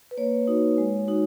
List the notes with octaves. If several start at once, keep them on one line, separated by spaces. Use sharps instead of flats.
B4
A#3 C#5
D#4 F#4
G#3
D#4 F#4